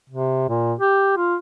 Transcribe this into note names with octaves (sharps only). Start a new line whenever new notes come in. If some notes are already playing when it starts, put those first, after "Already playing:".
C3
A#2
G4
F4